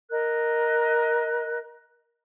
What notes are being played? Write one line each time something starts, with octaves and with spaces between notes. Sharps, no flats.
A#4 D#5 F#6